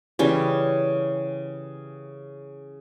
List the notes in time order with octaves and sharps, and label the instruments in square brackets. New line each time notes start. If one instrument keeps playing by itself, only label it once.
[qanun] C#3 E3 G3 C#4